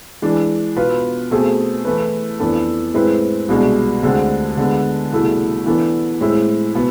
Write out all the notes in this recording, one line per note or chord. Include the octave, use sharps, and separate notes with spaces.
E3 G#3 D4
B2 B3 F4 B4
B2 A3 C4 G#4
E3 A3 E4 B4
F2 E3 B3 D4 A4
A2 G#3 C4 E4 B4
C2 B2 G#3 D4
D2 D3 G#3 C4
D3 G#3 B3
C2 B2 A3 E4 G#4
E3 B3 D4 A4
A2 G#3 C4 E4
B2 B3